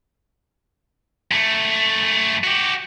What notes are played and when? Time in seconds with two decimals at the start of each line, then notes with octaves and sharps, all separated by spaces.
1.31 F#2 A3
2.44 F#4 G4